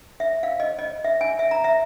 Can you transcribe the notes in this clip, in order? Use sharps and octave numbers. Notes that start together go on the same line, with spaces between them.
E5
F5
D#5
D#5
E5
G#5
E5
A#5
E5